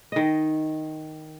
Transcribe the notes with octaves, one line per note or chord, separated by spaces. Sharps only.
D#3 D#5